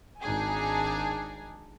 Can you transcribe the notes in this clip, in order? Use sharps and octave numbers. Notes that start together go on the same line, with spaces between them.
G#1 D4 D#4 G#4 G#5